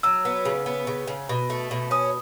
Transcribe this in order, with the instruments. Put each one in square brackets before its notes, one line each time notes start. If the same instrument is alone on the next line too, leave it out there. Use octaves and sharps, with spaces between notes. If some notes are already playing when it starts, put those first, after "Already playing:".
[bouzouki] F#3 [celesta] E6
[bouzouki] B3
C#3
B3
C#3
C#3
B2
A3
B2
[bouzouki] C#4 [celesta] D#6